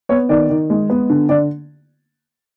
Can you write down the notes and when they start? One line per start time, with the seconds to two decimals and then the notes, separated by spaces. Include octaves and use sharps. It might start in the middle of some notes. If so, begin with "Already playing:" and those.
0.09 B3 C#5
0.29 D#3 D5
0.50 D#3
0.70 G#3
0.90 B3
1.10 D3
1.29 D3 D5